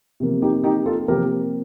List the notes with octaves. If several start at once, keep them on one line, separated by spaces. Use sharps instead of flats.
C3 F3 A#3
D#4 G4
D#4 G4
F4 A4
C3 F3 A#3 G4 A#4